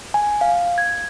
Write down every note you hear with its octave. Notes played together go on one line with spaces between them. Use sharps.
G#5
F5
G#6